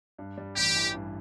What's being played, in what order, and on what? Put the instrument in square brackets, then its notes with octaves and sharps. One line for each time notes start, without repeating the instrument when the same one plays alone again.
[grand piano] G2
G3
[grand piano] A1 [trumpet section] G4
[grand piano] E3
G2